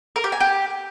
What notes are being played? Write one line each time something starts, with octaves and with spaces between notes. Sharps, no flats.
A#4
G4
G#5
G4